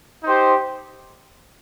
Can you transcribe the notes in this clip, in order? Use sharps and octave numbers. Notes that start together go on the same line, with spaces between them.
D#4 G4 C5